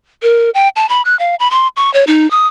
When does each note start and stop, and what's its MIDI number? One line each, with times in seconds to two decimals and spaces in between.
0.23 0.50 70
0.54 0.68 79
0.76 0.88 81
0.89 1.02 83
1.05 1.17 90
1.19 1.35 77
1.40 1.50 83
1.51 1.68 84
1.77 1.93 85
1.94 2.04 73
2.07 2.29 63
2.31 2.47 87